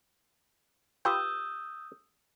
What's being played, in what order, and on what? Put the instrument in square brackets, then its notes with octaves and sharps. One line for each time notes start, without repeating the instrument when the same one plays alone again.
[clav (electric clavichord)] F4 G4 B4 [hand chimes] D#6 E6 G6